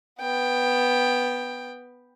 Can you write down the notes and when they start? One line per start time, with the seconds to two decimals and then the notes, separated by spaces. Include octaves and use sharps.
0.20 B3 G5